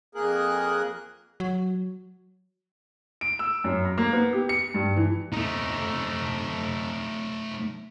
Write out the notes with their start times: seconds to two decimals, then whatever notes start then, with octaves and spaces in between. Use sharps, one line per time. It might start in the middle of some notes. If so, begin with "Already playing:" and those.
0.15 F2 A#3 G#4 A#4 F#6
1.40 F#3
3.21 D7
3.39 E6
3.64 F#2
3.85 A#5
3.98 A#3
4.13 B3
4.33 G4
4.49 C#7
4.74 G2
4.96 E3
5.33 A3 D#4